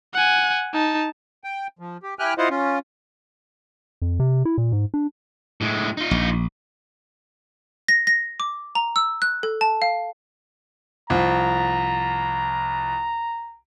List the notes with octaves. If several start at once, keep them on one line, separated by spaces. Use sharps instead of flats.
F#5 G#5
D#4 A5
G5
F3
G4
E4 G4 G5 G#5 F6 F#6
E4 F4 C5 D#5 F5 F#5
C#4 F4
F2
C3
E4
A#2
G#2
D4
A2 G#3
D#4 F4
A#1
A#6
A#6
D6
A#5
E6
F#6
A4
A5
F5
C2 F3 A#5